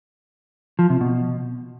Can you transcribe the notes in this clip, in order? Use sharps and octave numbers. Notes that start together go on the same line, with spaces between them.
F3
C3
B2